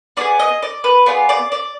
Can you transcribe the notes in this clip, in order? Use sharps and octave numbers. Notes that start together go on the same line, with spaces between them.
B3 F4 G#4 D5
D#5
D5
B4
B3 F4 G#4 D5
D5
D5